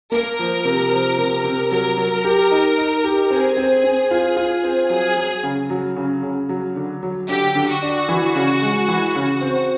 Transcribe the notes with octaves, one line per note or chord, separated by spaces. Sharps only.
A#3 A#4
F3
C3
F3
C3
C3
F#3 A#4
F#3
G4
D#4
D#4
G4
C4 G#4
C4
C4
F4
F4
C4
F#3 G#4
F#3
C#3
F#3
C#3
C#3
F#3
D3
F#3
D3 G4
D3
F#4
D4
E3
C#3
G#3
E3
C#3
C4